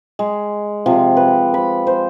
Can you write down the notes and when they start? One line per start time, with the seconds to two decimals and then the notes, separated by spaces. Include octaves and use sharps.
0.19 G#3
0.86 C3 F3
1.17 B4
1.54 B5
1.87 C5